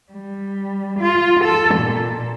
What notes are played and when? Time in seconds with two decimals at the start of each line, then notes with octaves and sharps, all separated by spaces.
0.12 G3
1.00 F4
1.44 A4
1.75 A#2